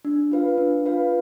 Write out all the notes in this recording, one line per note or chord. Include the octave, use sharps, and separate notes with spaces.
D4
F4 B4 F5
D4
F4 B4 F5